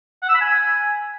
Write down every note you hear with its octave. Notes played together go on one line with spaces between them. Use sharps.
F#5
E6
B5
G#5